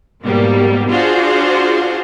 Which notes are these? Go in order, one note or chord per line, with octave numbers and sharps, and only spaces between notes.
G#2 B2 G3 A#3
D4 F4 F#4 G#4 C5